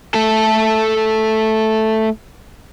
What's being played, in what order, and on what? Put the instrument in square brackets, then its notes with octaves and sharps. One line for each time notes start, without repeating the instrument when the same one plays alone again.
[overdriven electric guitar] A3 A4